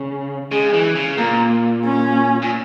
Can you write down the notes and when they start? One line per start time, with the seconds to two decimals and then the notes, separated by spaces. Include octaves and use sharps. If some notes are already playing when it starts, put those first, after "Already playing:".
Already playing: C#3
0.52 C#3 G#3
0.73 E3
0.95 C#3
1.18 A#2 A#3
1.84 C#4
2.42 A#2